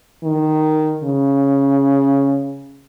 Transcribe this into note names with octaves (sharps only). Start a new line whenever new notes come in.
D#3
C#3